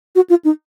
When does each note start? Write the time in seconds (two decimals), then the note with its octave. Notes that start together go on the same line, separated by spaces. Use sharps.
0.16 F#4
0.30 F4
0.45 D#4